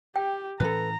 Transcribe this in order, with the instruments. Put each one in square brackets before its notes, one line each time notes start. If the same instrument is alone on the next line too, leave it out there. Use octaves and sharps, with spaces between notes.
[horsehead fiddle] G4 [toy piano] G5
[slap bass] A2 E3 C#4 [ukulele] A4 B4 [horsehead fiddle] A#5